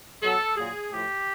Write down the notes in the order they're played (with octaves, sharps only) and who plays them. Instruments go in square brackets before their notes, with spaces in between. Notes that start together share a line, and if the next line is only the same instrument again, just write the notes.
[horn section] B2 F#3 A4
A#2 F#3 G#4
A2 F3 G4